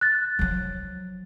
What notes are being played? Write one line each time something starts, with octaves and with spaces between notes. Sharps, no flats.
F#6 A6
F3 F#3